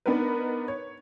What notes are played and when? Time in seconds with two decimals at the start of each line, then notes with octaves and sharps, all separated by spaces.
0.06 B3 D4 D#4 A#4 B4
0.68 C#5